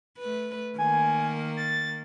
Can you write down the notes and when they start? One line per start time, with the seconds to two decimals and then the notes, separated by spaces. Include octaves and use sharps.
0.19 A3 B4
0.78 D#3 A#3 G#5
1.57 A6